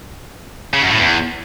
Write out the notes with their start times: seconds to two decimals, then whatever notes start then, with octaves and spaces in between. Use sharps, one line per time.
0.73 C#3
0.82 F#2
0.90 A2
0.99 E2